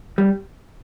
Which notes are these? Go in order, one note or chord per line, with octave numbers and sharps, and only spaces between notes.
G3